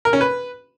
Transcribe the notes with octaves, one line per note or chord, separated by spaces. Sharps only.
A#4
C#4
B4